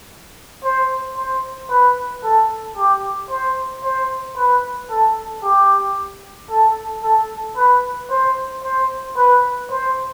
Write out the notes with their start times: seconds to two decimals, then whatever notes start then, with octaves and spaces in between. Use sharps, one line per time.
0.64 C5
1.17 C5
1.70 B4
2.24 A4
2.77 G4
3.30 C5
3.84 C5
4.37 B4
4.91 A4
5.44 G4
6.51 A4
7.04 A4
7.57 B4
8.11 C5
8.64 C5
9.17 B4
9.70 C5